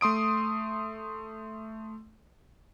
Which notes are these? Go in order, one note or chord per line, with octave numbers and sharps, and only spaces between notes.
A3 C6 D#6 D7